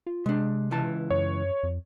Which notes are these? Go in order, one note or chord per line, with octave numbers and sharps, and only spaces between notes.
F4
C3 G#3 D4
C#2 E3 A5
F#2 C#5
F2